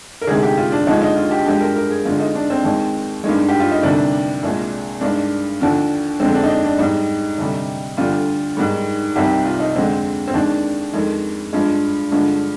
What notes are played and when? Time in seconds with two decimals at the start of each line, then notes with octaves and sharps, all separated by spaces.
0.22 A#4
0.27 D2 C3 D#3 G#3 G#4
0.42 G4
0.57 F4
0.72 D4
0.87 D#2 D3 F3 G#3 D#4
1.02 D#4
1.16 F4
1.31 G4
1.46 G2 F3 G#3 G4
1.61 A#4
1.76 A#4
1.90 G#4
2.05 D2 D3 G#3 F4
2.20 D#4
2.35 D4
2.50 C4
2.64 D#2 D#3 G#3
3.24 G2 D#3 G#3
3.49 G4
3.60 F4
3.72 D#4
3.83 D2 C3 D#3 G3 D4
4.43 C2 A#2 G#3
5.01 G2 D#3 G#3 D4
5.60 D#2 D3 F3
6.20 F2 D3 G#3 C4
6.35 D4
6.44 D#4
6.50 D4
6.64 D4
6.79 G#2 G3 D#4
7.38 D2 C3 G3
7.97 D2 D3 G3 F4
8.57 G#2 D#3 G3
9.16 C2 C3 D#3 G3 G4
9.45 F4
9.60 D#4
9.75 F2 D3 G#3 C4
10.28 C4
10.34 D#2 D#3 G#3 D4
10.93 F2 D#3 G#3
11.53 G2 F3 G#3
12.12 G2 D3 F3 G#3